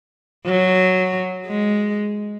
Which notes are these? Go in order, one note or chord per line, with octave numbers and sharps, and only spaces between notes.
F#3
G#3